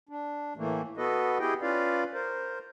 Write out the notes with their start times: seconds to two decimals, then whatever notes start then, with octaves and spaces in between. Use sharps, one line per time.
0.09 D4
0.57 A2 E3 A3 A#3
0.97 B3 F#4 A4 B4 D#5
1.40 E4 G4 G#4 D#5 G5
1.62 C#4 F4 B4 D5 F5
2.14 A#4 C5